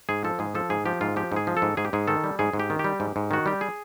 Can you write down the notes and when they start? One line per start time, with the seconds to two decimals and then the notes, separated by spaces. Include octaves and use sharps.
0.09 G#2 G#4
0.24 F3 A4
0.39 G#2 G#4
0.55 F3 A4
0.70 G#2 G#4
0.86 F3 G4
1.01 G#2 F4
1.16 F3 G4
1.32 G#2 G#4
1.47 F3
1.57 A4
1.62 G#2
1.77 G#2 G#4
1.85 G4
1.93 G#2 G#4
2.07 D#3 A4
2.24 G3
2.39 G#2 G#4
2.53 G#2
2.59 G4
2.70 D#3
2.79 G4
2.84 G3
3.00 G#2
3.16 G#2
3.31 D#3 F#4
3.46 G3 G4
3.61 G#4